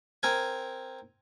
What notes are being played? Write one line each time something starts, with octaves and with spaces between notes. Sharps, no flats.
C4 A#4 G#5